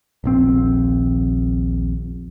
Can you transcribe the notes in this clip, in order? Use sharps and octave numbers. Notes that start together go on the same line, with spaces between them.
D#1 A#1 C4